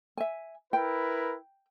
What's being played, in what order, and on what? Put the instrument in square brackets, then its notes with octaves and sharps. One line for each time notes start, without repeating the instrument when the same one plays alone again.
[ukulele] E5 G#5
[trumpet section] E4 A#4 B4 [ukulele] G5